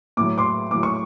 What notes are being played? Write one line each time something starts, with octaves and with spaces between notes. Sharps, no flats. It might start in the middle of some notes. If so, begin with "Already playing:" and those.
A2 F#3 D6
C6 D6
A2 F#3 D6
C#6